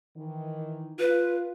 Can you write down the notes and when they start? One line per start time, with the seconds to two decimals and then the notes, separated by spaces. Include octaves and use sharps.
0.17 D#3 E3
1.00 F4 B4